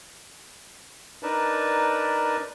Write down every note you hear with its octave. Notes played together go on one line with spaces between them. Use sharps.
D4 D#4 A#4 B4 D5 A5